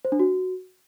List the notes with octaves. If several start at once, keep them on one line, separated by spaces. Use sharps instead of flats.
C5
D4
F#4